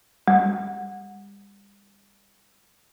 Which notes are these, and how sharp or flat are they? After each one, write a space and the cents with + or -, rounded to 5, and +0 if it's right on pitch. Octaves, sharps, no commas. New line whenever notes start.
G3 +40